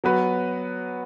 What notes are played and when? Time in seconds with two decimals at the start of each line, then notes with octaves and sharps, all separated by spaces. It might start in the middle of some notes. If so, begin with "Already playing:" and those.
0.04 F#3 B3 F#4 B4